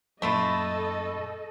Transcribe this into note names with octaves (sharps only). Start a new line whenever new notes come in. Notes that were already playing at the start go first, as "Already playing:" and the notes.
F#2 A#2 A3 E4 F4 A4 D#5 B5